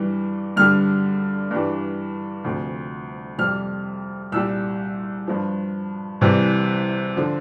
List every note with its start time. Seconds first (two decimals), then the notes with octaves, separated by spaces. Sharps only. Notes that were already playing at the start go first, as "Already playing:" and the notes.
Already playing: G2 E3 G3
0.56 G2 D3 G3 F6
1.51 G2 E3 G3
2.44 D2 C3 F3
3.38 F2 C3 G3 F6
4.32 C2 A#2 G3 E6
5.27 G2 F3
6.21 C2 C3 E3 G3
7.17 D3 F3